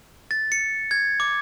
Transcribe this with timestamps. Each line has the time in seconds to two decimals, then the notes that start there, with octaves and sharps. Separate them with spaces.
0.31 A6
0.52 C#7
0.91 G#6
1.20 D6